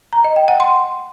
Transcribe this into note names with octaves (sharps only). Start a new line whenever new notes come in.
A#5
D#5
G5
F#5
C6